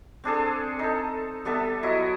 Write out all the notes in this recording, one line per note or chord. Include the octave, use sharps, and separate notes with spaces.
C4 D4 G#4 A4
D#4 A4
G3 B3 A4 E5
F#3 E4 D#5